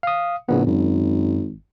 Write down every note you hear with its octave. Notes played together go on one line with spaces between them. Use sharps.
F5 D#6
A#1 A2 C#3 B3
G#1 F#2